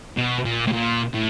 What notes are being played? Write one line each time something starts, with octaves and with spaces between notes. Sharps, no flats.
B2
A#2
A2
A#2
A2